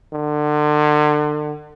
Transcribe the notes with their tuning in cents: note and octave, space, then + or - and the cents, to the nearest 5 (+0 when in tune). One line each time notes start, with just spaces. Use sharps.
D3 +35